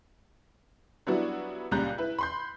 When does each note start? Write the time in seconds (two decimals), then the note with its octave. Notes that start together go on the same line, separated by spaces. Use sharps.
1.07 F#3 G3 B3 D4 E4 F#4
1.71 C#2 A#2 G3 A#5 F#6 G6
1.98 E4 B4
2.19 B5 C6 G6